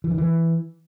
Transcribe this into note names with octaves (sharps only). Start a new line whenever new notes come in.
E3
D#3
E3